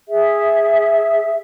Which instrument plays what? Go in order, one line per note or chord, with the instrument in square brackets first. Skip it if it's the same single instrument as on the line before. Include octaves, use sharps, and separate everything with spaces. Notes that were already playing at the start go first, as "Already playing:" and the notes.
[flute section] G#4 E5